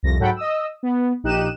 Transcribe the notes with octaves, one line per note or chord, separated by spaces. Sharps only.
C2 F2 A#6
G#2 F#3 A4 F#5 G5 B5
D#5 D#6 E6
B3
A#1 D#4 G4 F#6 D#7 E7